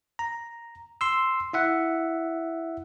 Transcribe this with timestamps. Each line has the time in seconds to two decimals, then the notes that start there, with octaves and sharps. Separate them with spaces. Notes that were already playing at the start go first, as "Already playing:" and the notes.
0.19 A#5
1.01 C6 E6
1.53 E4 E5 F#5